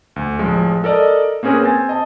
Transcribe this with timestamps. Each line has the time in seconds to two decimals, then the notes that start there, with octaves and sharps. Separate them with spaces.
0.16 D2
0.39 A1 F3 G#3
0.84 A4 A#4 D5 D#5
1.43 A#3 C4 C#4 G#4 A#4 B4
1.63 C4 G#5 A6
1.89 D#5 A5